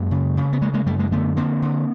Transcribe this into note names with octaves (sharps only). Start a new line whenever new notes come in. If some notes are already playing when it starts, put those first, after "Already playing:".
Already playing: F#2 G#3 A#3
C#3
C#3
B3
C#3 G#3 A#3
G#3 A#3
F#2 G3 A3
G#3 A#3
D3 A3 B3
D3 A#3 C4
D3